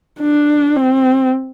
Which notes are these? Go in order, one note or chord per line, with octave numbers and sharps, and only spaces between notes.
D4
C4